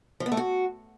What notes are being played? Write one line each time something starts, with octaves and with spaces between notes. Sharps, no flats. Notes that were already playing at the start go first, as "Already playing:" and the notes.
F3
B3
A3
F#4